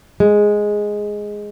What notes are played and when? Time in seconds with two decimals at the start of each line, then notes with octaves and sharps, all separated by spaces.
0.20 G#3